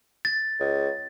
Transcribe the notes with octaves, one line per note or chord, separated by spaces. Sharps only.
A6
C#2